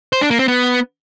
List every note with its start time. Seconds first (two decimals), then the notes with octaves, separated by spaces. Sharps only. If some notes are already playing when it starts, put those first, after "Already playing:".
0.13 C5
0.21 D4
0.30 A#3
0.39 C4
0.48 B3